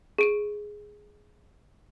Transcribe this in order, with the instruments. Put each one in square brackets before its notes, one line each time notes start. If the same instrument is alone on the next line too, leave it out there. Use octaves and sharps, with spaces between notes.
[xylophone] G#4 D7 D#7